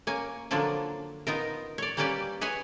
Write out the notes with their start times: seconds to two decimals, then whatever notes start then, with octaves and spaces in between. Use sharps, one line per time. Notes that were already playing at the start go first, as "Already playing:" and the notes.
0.07 A#3 C#4 G#5
0.51 D3 F3 F#3 A#3 D4 F4
1.27 B3 D#4 F4 A#4
1.78 C#5 D5
1.97 G3 A#3 C#4 G4 B4 D5
2.41 G#4 B4 C#5 F#5 G#5